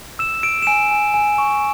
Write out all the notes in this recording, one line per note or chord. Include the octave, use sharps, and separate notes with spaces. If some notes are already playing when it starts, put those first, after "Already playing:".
E6 E7
E6 D7
E7
G#5 D7
G#5
G#5
C#6